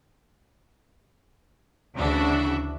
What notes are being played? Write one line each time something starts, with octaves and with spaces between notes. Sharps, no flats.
D2 C#3 E3 D4 F#4 E5